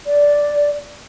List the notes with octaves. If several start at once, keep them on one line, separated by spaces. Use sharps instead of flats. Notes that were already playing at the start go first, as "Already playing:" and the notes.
D5